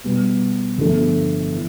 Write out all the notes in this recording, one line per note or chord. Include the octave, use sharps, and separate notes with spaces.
B2 G3 B3
G1 G2 D3 F3 A3
E3